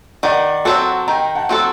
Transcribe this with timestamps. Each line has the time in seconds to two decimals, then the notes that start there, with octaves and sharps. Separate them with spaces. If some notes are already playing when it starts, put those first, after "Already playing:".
0.23 D#3 D5 F#5
0.65 F#3 C4 F#4 A4 F#5 A5
1.08 D#3 G5 A#5
1.35 F#5 A5
1.49 F#3 C4 F#4 A4